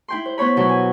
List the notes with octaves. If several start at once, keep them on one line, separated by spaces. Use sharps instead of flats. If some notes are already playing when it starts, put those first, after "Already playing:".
E4 G5 C6
C5
B3 C5 C#5 B5
B2 F#3 E4
G#5